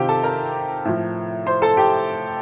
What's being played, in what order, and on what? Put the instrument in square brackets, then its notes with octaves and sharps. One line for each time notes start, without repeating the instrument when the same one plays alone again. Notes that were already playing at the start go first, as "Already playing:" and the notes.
Already playing: [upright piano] C3 D#3 F4 G4 C5 G5
A4 A5
A#4 A#5
A2 F3
C5 C6
A4 A5
G4 G5